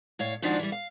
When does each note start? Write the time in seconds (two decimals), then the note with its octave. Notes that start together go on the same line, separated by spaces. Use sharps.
0.19 A2 C#5 F5
0.42 G#2 D#3 F3 D4 F4 F#4
0.59 E3 G3
0.72 F5